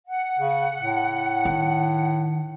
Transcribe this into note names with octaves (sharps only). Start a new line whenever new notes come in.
F#5
C#3
A2
D#3